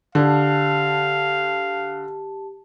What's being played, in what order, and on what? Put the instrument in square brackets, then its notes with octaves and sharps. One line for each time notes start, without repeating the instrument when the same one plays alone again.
[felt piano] D3 [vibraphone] G4 A5 [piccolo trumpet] F5